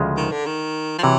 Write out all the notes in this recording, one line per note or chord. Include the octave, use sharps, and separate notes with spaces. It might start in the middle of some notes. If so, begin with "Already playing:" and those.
Already playing: D2 C#3 F3 G#3
D#3
D3
D#3
F3
C3 E3 F#3